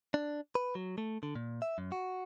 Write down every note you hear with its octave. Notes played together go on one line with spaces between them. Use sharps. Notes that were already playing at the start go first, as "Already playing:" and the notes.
D4
B4
F#3
A3
D3
A#2
E5
F#2
F#4